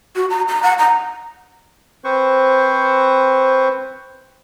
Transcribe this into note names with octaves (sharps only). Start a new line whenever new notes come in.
F#4
A#5
A#5
F#5
A#5
C4 B4 C5 C#6